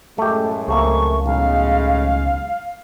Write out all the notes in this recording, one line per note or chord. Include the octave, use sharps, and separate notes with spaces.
F#2 A2 G#3 A3 G4
C#2 C3 A3 A#3 C#6
B1 A2 C#3 G#3 F5